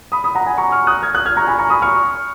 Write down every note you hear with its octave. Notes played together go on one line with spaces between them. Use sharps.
B5 D#6
B5 D#6
F#5 A#5
G#5 B5
A#5 C#6
C#6 F6
D#6 F#6
F6 G#6
D#6 F#6
F6 G#6
A#5 C#6
G#5 B5
A#5 C#6
B5 D#6
C#6 F6